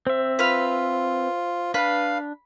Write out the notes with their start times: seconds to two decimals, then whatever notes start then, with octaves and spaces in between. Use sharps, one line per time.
0.07 C4 C5 E5
0.39 F4 B4 F6
1.74 D4 B4 F5